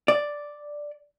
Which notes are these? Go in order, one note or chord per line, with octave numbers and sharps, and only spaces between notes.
D5